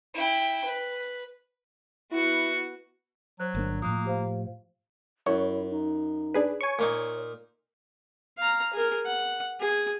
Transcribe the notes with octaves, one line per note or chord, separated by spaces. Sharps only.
E4 G5
B4
B3 E4 F#4
F#3 C5 F#6
G1 A#3 D4
A2 F3 A#3 D#6 F#6
G4 C5 F5
F#2 E4 C#5
D#4
D4 G#4 B4
C#5 G#5 C#6
A#2 A#3 D#4
F5 A#5
G#4 A#4
F#5
G#4